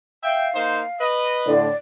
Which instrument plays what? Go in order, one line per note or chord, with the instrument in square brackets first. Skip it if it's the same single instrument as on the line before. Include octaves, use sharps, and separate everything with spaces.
[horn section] E5 G5 [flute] F5
[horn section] A#3 D#4 C5
B4 D#5
[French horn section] A2 D3 [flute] D5